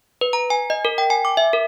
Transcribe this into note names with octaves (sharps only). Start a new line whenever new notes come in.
B4
A#5
G#5
D#5
A#4
G5
G#5
D6
E5
A#4